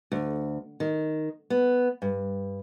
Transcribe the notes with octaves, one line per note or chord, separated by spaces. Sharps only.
D2
D#3
B3
G2